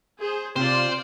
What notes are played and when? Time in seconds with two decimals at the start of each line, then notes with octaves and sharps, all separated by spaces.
0.18 G#4 C5
0.56 C3 F4 C5 D5